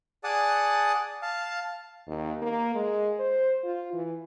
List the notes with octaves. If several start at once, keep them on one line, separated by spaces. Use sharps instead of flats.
G#4 D5 F#5 A5 D#6
F5 A5
D#2
A#3
G#3
C5
F4
E3